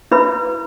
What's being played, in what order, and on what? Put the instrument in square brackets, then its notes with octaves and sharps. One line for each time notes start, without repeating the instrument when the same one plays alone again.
[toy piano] E4 B4 B5